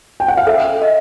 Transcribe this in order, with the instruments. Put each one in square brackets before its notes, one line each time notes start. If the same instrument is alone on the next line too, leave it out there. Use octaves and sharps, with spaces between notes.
[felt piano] G5
F#5
F5
[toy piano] A4 [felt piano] E5
[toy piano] D#5